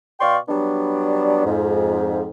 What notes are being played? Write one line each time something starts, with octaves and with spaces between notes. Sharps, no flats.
B2 D5 F5 G5 C6 C#6
F#3 G3 B3 D4
F2 G#2